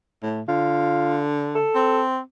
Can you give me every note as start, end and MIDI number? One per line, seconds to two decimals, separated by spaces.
0.23 0.42 45
0.48 1.68 50
0.48 1.22 65
1.55 2.01 69
1.75 2.20 60